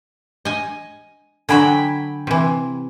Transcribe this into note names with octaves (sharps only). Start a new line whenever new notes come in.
D#5 G#5
D3 F#3 G5 G#5 B5
C3 E3